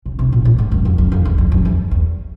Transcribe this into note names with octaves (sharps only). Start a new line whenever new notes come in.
C#3
C3
A#2
A2
G#2
F#2
F2
F#2
F2
E2
F2
F#2
E2
E2